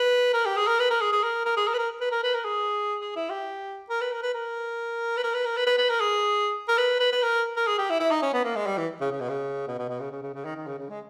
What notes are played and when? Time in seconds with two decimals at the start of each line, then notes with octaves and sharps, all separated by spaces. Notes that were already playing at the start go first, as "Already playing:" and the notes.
Already playing: B4
0.34 A#4
0.46 G4
0.57 G#4
0.67 A#4
0.79 B4
0.90 A#4
1.01 G#4
1.13 G#4
1.23 A#4
1.46 A#4
1.57 G#4
1.68 A#4
1.74 B4
1.79 A#4
2.01 B4
2.12 A#4
2.24 B4
2.34 A#4
2.45 G#4
3.00 G#4
3.16 E4
3.30 G4
3.90 A#4
4.01 B4
4.12 A#4
4.23 B4
4.34 A#4
5.17 B4
5.23 A#4
5.34 B4
5.45 A#4
5.57 B4
5.67 B4
5.78 B4
5.89 A#4
6.01 G#4
6.68 A#4
6.78 B4
7.00 B4
7.12 B4
7.23 A#4
7.57 A#4
7.67 G#4
7.78 G4
7.90 E4
8.00 E4
8.11 D#4
8.22 C#4
8.33 B3
8.44 A#3
8.56 G#3
8.67 G3
8.78 E3
9.01 C#3
9.11 C#3
9.21 B2
9.29 C#3
9.68 B2
9.78 B2
9.89 B2
10.00 C#3
10.12 C#3
10.23 C#3
10.34 C#3
10.45 D#3
10.56 D#3
10.67 C#3
10.79 C#3
10.90 G#3